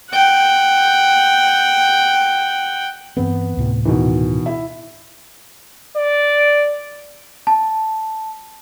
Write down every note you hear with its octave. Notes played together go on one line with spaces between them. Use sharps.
F#5 G5
G2 E3 B3 C4
D2 A2 C3
B2 D#3 E3
E4 E5
D5
A5